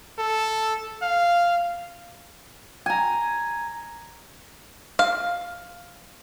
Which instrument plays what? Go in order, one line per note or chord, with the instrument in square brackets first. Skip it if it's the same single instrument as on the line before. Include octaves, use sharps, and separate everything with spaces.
[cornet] A4
F5
[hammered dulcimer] G#5 A#5
[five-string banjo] F5